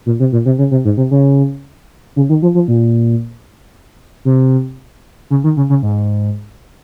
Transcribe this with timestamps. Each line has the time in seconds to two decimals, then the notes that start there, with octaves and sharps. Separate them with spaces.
0.06 A#2
0.20 C3
0.32 A#2
0.46 C3
0.58 C#3
0.71 C3
0.85 G#2
0.97 C3
1.11 C#3
2.16 C#3
2.29 D#3
2.42 F3
2.55 F3
2.68 A#2
4.25 C3
5.30 C#3
5.44 D#3
5.57 C#3
5.70 C#3
5.83 G#2